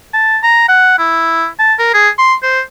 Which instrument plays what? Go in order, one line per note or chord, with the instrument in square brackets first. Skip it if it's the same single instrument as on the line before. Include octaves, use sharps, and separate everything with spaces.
[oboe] A5
A#5
F#5
E4
A5
A#4
G#4
C6
C5